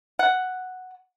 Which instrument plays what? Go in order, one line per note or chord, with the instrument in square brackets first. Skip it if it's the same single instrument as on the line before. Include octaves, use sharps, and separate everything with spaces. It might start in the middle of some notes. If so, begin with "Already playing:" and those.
[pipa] F#5